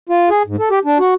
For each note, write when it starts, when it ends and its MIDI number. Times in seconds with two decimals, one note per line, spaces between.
0.09 0.29 65
0.29 0.43 68
0.47 0.56 44
0.59 0.69 69
0.71 0.79 67
0.85 0.98 62
0.99 1.14 66